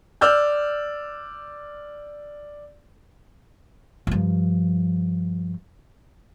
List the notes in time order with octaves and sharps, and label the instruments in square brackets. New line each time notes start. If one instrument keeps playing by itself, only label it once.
[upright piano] D5 E6 F6 G6
[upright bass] G2 F3